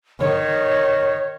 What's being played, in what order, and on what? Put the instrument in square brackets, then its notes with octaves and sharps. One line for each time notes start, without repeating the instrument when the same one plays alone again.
[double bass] D#3 [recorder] C#5